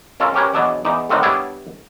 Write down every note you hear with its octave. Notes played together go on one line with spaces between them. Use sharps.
C#4 F4 A4 A#4
C#4 G4 A#4 B4 C#5
E2 B2 F#3 D4 D5
E2 D#4 D5
A2 D3 D#3 C4 D4 F#5
G3 B3 D4 E4 C#5 D5